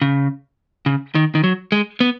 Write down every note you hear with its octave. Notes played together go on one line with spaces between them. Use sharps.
C#3
C#3
D#3
D#3
F#3
G#3
B3